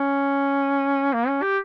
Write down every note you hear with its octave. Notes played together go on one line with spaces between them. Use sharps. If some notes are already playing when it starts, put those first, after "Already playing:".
Already playing: C#4
A#3
C#4
G4